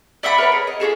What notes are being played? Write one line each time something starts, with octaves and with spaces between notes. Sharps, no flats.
D5 E5 F#5 B5
A#4 B4 C#5
G#4
D#5
F4 F#4 G#4 A4